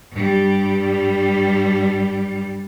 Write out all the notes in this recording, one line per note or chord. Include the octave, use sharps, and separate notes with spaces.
G2 G3